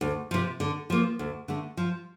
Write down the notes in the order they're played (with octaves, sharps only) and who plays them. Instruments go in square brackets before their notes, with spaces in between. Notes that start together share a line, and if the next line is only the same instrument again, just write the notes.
[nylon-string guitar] D2
C3 F3
D3
F3 A#3
D2
D3 A3
F3